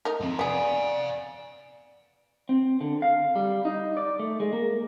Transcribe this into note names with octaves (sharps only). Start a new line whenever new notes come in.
A3 D#4 A#4
F3 C4
B3 G#4 D5 F5 G#5
C4
D3
F5
G3
D#4
D5
A3
G#3
A#3